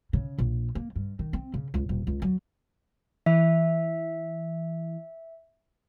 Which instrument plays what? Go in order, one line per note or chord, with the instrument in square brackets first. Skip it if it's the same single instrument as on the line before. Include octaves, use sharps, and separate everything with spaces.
[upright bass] C#3
A#1
A#3
G2
D#3
C4
C#3
C#2
D#1
C#2
F#3
[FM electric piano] E3 [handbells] E5